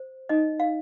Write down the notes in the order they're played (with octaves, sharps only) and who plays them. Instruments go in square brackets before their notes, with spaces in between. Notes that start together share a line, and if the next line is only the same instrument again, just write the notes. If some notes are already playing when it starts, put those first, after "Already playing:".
Already playing: [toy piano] C5
D#4 D#5
F5